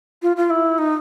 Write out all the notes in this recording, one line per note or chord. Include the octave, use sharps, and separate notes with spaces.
F4
F4
E4
D#4